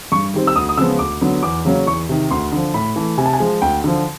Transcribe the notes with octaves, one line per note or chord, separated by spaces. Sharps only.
G2 C#6
D#3 G3 C4
E6
D2 D#6
D#6
C#3 F3 G#3 B3 E6
D2 D6
D3 F#3 B3
E2 D6
C#3 F#3 A#3 C#4
E2 C#6
C3 D#3
D2 C6
D3 F3
A2 B5
E3 A3
C3 G#5
A5
G#5
F3 G#3
D2 G5
D3 F3